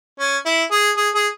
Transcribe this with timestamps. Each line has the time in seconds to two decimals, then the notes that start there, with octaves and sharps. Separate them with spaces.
0.20 C#4
0.46 E4
0.72 G#4
0.97 G#4
1.15 G#4